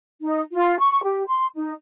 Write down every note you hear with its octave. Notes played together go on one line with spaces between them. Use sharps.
D#4
F4
C#6
G4
C6
D#4